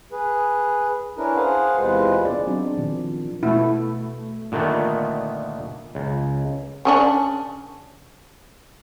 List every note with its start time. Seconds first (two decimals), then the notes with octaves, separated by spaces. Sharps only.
0.12 G#4 B4
1.18 C#4 D4 E4 A#4 B4
1.36 G#4 C5 F5 F#5
1.78 E2 C3 G#3 F4 B4 C5
2.24 B3 D4 G#4 D5
2.47 F#3 C4 D4 D#4 F#4
2.77 A#2 D#3 F3
3.43 B2 A3 E4
4.52 A#2 D3 D#3 A3 B3
5.95 C#2
6.85 C#3 C#4 D4